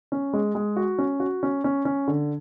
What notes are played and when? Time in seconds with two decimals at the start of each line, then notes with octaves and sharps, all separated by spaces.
0.12 C#4
0.33 G#3
0.55 G#3
0.76 F#4
0.98 C#4
1.20 F#4
1.43 C#4
1.64 C#4
1.85 C#4
2.07 D3